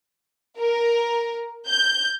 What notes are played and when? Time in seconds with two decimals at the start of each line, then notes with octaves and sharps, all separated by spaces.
0.59 A#4
1.68 G6